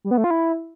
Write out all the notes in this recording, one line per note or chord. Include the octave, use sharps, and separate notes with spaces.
G3
B3
A3
F4
E4